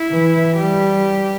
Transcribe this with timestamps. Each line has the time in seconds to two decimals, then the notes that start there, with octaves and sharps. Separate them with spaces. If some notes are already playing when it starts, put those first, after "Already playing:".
Already playing: E4
0.11 E3
0.57 G3 G4